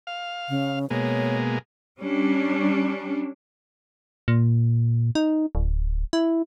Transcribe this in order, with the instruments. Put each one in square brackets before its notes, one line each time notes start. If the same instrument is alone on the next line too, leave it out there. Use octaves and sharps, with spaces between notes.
[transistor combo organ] F5
[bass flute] C#3
[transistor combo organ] B2 G#3 A#3 [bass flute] C#5
[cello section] G3 C#4 D4
[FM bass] A#2
D#4
D1
E4